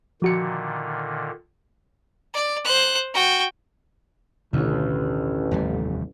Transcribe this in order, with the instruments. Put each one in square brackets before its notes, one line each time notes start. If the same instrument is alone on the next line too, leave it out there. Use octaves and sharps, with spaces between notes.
[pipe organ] A#2 D3 D#3 [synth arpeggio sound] F3 F#4 C#7
[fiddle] D5
C5 F#6
F#4 G5
[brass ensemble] A1 [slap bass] D2 [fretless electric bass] B2 D3 D#3
[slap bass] F1 D#2 G3